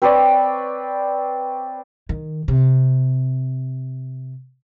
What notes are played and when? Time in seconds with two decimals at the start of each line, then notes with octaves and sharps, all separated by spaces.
0.02 C4 B4 C#5 D5
2.09 D#3
2.48 C3